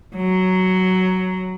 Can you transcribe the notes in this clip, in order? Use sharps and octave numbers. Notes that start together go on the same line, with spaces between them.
F#3